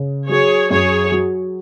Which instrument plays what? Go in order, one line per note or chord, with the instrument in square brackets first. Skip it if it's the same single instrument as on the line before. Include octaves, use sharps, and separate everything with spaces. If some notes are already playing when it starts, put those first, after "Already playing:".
Already playing: [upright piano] C#3
[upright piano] F#3 [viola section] G#4 C#5
[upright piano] F#2 [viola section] G#4 C#5
[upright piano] F#3